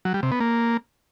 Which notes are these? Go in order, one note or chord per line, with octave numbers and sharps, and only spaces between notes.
F#3
G3
C3
B3
A#3